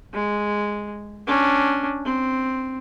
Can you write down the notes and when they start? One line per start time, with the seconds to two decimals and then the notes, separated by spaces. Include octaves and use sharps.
0.13 G#3
1.27 C#4 D4
2.05 C4